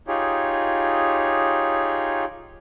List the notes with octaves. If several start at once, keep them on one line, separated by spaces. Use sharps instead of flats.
D#4 F4 G4 G#4 C#5